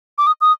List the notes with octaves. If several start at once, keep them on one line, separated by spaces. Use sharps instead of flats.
D6
D#6
D#6